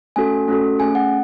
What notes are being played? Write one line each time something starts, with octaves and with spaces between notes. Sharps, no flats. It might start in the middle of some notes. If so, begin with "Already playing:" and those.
A3 C#4 F#4 A4 G#5
A3 C#4 F#4 A4
A3 C#4 G#4 G#5
F#5